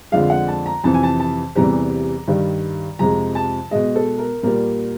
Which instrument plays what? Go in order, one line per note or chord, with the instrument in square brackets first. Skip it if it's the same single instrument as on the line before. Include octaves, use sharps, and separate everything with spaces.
[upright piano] F2 D3 F3 G#3 F5
F#5
A5
A#5
F2 C3 E3 A5
G#5
A5
A5
E2 C3 E3 G3 A#5
G2 D#3 G3
F2 C3 F3 G#3 A#5
A5
B2 G#3 D#5
A4
A#4
A#2 G3 A#4